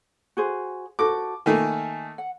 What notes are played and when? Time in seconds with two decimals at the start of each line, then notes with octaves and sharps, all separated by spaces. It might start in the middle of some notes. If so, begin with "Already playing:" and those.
0.37 F#4 G#4 C5
0.99 F#4 A4 C5 D6
1.46 D#3 A3 A#3 G#5
2.18 F#5